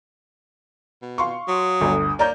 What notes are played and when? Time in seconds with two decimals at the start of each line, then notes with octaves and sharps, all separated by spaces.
1.02 B2
1.18 F5 C6 C#6
1.48 F#3 D#6
1.81 G1 D2
2.19 A#3 C#5 D5 A#5 G6